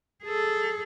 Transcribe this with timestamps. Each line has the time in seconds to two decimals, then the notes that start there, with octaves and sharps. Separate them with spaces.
0.24 G#4 A4